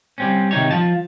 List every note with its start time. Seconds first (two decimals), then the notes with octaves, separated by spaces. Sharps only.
0.18 G3 C4 C#4
0.51 C3 D#3 D#4 C#5
0.71 F3 A5